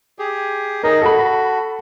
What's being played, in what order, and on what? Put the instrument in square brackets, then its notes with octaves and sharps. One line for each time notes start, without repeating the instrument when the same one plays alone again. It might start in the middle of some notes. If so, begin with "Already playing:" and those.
[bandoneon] G4 G#4
[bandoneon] D#4 G#4 D#5 [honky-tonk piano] A#4
[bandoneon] F#4 [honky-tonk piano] A4 B5